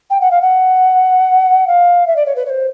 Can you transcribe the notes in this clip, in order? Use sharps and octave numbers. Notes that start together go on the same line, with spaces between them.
G5
F#5
F5
F#5
F5
E5
D5
C#5
B4
C#5
C5